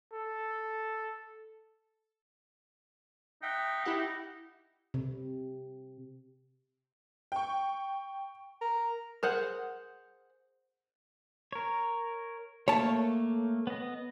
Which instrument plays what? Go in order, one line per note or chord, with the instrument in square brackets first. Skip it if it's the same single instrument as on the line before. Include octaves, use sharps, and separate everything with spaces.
[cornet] A4
[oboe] D#4 [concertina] E5 F#5 G5
[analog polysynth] E4 G4 F#5
[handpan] C3
[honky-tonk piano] G5 C#6
[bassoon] A#4
[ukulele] G#4 C5 F#5 [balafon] A#4
[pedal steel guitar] A#4 C#5
[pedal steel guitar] A3 A#3 [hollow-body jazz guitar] C#5 A5
[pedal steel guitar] B3 D#5